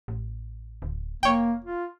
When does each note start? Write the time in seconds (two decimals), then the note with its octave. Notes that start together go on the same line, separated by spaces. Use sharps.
0.08 A1
0.82 D1
1.23 F1 A#3 C#5 G5
1.64 F4